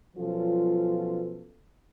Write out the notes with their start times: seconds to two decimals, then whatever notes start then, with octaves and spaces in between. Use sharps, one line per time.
0.17 B2 F3 F#3 C#4 F4 A4